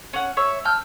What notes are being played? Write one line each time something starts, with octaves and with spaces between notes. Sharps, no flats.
C#4 F#5
C#5 E5
A5 E6 F6 G6